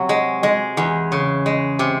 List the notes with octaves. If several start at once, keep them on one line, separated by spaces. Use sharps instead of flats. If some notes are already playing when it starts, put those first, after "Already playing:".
Already playing: C3 F#3
G#3
G#3
E2
C#3
G#3
C3